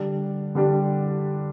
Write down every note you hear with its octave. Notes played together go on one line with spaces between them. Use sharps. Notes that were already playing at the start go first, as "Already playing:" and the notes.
Already playing: D3 G3 D4 G4
D3 G3 D4 G4